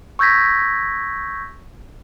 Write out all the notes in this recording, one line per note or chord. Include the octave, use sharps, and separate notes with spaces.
C#6 E6 G6 G#6 A#6 B6